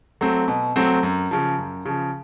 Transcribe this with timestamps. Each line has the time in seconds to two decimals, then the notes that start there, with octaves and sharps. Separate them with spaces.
0.21 F#3 A3 C4
0.48 B2
0.76 F#3 A3 C4
1.03 F#2
1.31 C#3 F3
1.58 F#2
1.85 C#3 F3